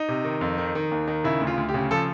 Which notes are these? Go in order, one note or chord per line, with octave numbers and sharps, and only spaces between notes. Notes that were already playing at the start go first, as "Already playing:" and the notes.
Already playing: D#4
C3
D#3
F2
D#3
D#3
D#2
D#3
C#3 E4
D2
F4
D2
G4
C#3
F3 A4